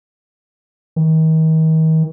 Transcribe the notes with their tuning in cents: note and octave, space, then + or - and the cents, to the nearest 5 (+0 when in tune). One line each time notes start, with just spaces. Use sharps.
D#3 +40